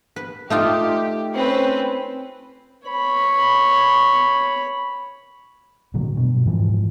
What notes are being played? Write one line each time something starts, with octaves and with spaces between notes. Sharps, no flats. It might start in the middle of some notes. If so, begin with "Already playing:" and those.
B4
A3 D#4 F4 G4
C4 C#4 B4
C#5 B5
A#2 D3 F#3
G2 B2
G#2 E3 F3